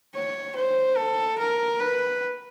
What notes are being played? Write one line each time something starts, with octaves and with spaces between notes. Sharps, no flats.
C#5
C5
A4
A#4
B4